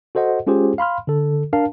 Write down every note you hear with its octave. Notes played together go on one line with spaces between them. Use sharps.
F#4 A4 C5 D#5 F#5
G#3 C#4 F4 G4 G#4 C5
F5 B5 C6 F6
D3 A4
D4 A#4 F5 A5